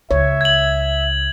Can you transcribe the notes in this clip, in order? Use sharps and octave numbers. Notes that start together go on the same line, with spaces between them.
C#2 C#5 E5
G#6 F#7